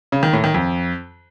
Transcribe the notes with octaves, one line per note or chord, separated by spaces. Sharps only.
C#3
D#3
A2
D#3
F2